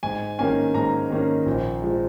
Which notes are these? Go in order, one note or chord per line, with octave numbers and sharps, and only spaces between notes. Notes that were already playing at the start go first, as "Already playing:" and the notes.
G#2 G#5
D#3 A#3 C#4 G#5
G#2 A#5
D#3 A#3 C#4
A#1
F3 G#3